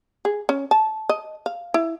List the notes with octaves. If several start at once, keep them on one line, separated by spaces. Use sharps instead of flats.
G#4
C#4
A5
D#5
F5
E4